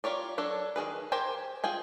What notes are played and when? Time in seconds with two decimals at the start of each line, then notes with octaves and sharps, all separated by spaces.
0.04 F4 G4 A#4 C#5 D5
0.38 F#3 D4 A4 C#5
0.76 D#3 E3 G#4 B4
1.12 G4 A#4 C5 G5 G#5
1.64 F4 G#4 G5 G#5